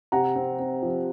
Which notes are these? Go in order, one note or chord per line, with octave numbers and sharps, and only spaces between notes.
C3 F#5 A#5
C4
C4
F3